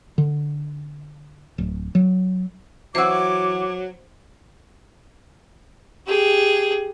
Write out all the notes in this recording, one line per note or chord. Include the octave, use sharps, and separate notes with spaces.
D3
D1
F#3
E3 F#3 F#4 C5 D6 E6
G4 G#4